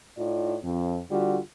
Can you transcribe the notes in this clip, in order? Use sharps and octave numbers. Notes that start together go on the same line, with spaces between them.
A2 D#4 F4 D5
F2
D3 G3 F4 F#4